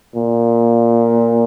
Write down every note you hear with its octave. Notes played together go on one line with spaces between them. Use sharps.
A#2